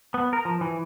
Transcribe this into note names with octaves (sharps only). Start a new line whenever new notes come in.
B3
A#4
F3
E3